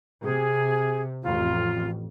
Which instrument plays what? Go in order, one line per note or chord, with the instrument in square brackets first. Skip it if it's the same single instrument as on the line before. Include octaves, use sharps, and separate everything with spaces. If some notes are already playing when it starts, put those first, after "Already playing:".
[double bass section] C3 [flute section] G#4
[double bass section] A1 F2 [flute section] F4